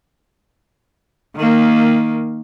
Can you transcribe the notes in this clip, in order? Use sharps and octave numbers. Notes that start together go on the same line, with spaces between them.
D#3 A#3